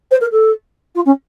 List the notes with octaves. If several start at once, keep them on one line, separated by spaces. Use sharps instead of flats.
C5
A#4
A4
F4
C#4